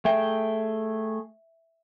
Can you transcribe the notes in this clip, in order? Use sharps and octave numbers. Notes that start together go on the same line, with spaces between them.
A3 G#4 E5 G5